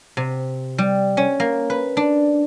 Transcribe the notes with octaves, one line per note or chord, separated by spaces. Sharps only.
C3
G3
C#4
A#3
B4
D4